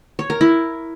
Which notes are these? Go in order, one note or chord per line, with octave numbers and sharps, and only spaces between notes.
C#5
A#4
E4